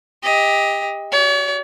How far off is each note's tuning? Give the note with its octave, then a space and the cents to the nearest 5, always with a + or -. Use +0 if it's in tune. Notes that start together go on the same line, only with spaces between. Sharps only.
G4 +30 D#5 +20
F#4 +0 C#5 +45